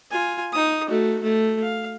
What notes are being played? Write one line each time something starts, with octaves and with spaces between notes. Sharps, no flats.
F4 G#5
D#4 D#6
A3 F#4
A3
F5